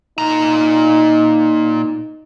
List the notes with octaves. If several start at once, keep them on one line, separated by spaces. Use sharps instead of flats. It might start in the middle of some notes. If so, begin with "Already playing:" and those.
A#2 D#4 A#5